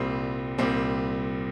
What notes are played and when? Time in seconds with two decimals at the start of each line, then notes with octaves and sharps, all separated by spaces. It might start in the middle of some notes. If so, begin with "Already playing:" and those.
Already playing: C2 A#2 G3 C4
0.58 C2 A#2 G3 C4